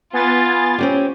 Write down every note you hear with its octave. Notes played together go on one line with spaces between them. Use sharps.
B3 F4 G#5 A6
C4 C#4 G4